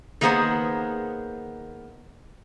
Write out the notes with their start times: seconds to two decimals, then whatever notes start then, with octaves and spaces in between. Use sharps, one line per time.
0.21 D#3 A#3 B3 G#4 C5 F#5